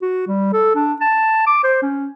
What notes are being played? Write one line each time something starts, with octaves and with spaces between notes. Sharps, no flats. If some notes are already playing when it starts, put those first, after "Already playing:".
F#4
G3
A4
D4
A5
D6
C5
C#4